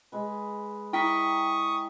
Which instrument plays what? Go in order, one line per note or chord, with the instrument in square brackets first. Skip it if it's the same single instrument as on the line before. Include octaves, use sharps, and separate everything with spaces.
[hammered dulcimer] G#3 B4
[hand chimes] E4 B6 [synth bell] G5 [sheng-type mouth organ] C#6 D#6